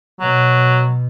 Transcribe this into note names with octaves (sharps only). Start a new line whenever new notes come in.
B2 F#3